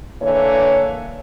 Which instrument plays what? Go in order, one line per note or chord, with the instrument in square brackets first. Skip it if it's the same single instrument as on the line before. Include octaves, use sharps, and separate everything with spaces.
[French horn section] D3 E3 A#3 C#5